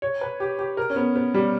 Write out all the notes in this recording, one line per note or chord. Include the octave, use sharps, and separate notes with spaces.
C#5
B4
G4
G4
A#4
C#4
B3
B3
G3